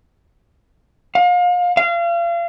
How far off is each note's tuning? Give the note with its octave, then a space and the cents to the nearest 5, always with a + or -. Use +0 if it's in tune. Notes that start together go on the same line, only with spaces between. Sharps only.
F5 +35
F5 -35